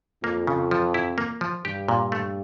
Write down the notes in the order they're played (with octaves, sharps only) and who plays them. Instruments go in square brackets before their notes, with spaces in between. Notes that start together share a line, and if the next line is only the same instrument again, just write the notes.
[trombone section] F2 [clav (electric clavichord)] A#3
[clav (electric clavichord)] C#3
F3
E4
A#3
F3
[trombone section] G2 [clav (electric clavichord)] G4
[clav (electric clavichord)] A#2
A3